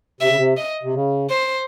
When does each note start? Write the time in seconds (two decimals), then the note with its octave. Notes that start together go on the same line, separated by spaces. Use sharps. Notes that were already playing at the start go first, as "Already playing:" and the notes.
0.21 C3 E5
0.29 C#3
0.36 C3
0.57 D#5
0.83 C3
0.94 C#3
1.30 C5